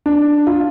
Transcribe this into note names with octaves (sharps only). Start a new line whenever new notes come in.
D4
F4